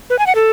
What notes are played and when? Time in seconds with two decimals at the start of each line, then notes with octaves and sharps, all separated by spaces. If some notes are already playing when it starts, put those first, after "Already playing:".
0.10 B4
0.19 G#5
0.27 F#5
0.35 A4